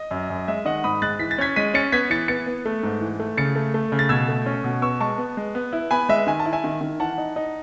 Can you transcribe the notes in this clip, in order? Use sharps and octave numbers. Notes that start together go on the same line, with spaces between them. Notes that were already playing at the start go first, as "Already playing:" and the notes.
Already playing: D#5
F#2
F#2
G#3 E5
D#3 D#5 F#5
G#2 B5 D#6
G#3 F#6 A6
E3 B6
A6
C#4 G#6 B6
G#3 B6 D#7
C#4 A6 C#7
B3 G#6 B6
E3 A6 C#7
B3 A6 C#7
B3
A3
G#2
E3
A3
C#3 A6 C#7
A3
A3
C#3
A6
B2 E6 G#6
A3
C#4
B2
B3 C#6 E6
G#3 A5 C#6
B3
G#3
B3
E4
B3 G#5 B5
G#3 E5
D#3 G#5
A5
E4
E5 G#5
D#3
D#3
E3 F#5 A5
D#4
D#4